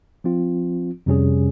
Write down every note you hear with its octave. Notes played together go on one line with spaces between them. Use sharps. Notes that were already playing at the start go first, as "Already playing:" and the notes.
F3 C4 F4
F2 C3 G3 C#4 G#4